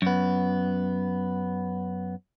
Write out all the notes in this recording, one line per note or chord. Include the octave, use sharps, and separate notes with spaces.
F#2 B3